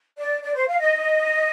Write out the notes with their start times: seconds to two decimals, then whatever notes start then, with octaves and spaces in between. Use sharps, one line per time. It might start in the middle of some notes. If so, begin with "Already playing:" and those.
0.18 D5
0.43 D5
0.55 C5
0.67 F5
0.80 D#5